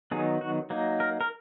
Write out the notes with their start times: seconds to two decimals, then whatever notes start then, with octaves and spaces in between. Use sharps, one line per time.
0.11 D#3 F#3 B3 D#4 G#4
0.41 F#4
0.70 F#3 A#3 D#4
1.00 A#4
1.21 A#4